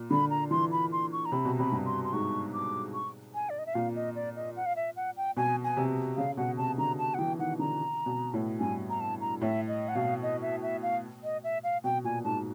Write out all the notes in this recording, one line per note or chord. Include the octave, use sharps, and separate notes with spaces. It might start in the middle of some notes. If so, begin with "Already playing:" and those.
Already playing: A#2
D3 B5
A#5
E3 C6
B5
C6
C#6
A#5
C3 B5
B2
C3 B5
G2
C6
C6
G#2 C#6
D6
C#6
G#5
D5
D#5
E5
A#2 F5
D#5
D5
D#5
F#5
F5
E5
F#5
G5
B2 G#5
G#5
C3
C#3 F5
B2 F#5
C3 A5
D3 A#5
A5
F#5
E3 G5
D#3 F#5
D3 A#5
B2
A2
G2 G#5
A#5
A5
A#5
A2 E5
D#5
F#5
B2 F5
D#5
E5
E5
F5
D#5
E5
F5
B2 G5
A#2 G#5
G#2 A5